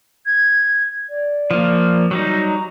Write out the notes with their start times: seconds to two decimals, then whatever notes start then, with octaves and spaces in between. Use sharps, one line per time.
0.26 G#6
1.10 D5
1.51 F3 A#3
2.11 F#3 G3 D#4
2.47 A#5